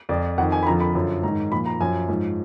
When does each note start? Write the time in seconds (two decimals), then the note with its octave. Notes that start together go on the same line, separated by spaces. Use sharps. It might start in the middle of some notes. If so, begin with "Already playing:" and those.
0.09 F2 F3 D5
0.38 F2 F#5
0.41 D#3
0.52 G#5
0.63 B5
0.67 F2 D3 F3 A#5
0.80 B5
0.95 F#2 D3 F3
1.23 G#2 A#5
1.28 D#3
1.52 A#2 F3 B5
1.66 A#5
1.80 F#2 F3 G#5
2.09 G#2 F3